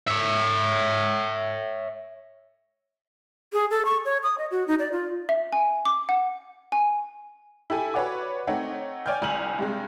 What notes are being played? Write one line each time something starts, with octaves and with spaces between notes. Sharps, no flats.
C#5 E5
G#4
A4
C#6
C#5
D#6
D#5
F#4
D#4
D5
F4
E5
G#5
D6
F#5
G#5
E4 G4 A4 G#5
F#4 B4 C#5 D5 F#5 D6
A3 C4 D#4 C#5 F#5
C#5 D5 G5 G#5 F6 G6
G1 C2 G#5 F6 F7 F#7
G2 C3 G#3